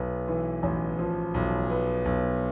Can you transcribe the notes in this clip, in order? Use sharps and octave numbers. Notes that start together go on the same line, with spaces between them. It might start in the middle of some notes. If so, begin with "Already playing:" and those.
Already playing: B1 B3
E3
A1
F3
B1
B3
B1